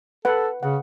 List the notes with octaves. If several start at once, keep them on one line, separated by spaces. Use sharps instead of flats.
A4 B4 F#5
C#3 F#5